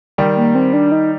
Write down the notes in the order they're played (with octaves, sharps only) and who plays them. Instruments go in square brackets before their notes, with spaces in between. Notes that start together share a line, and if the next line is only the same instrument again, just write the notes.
[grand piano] D#3 G3
[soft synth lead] A#3
C4
D4
D#4